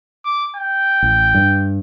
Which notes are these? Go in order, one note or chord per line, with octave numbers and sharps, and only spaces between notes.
D6
G5
A1
G2